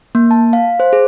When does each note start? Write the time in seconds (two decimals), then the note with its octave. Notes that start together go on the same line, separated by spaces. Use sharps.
0.15 A#3
0.31 A5
0.53 F5
0.80 C5
0.93 G#4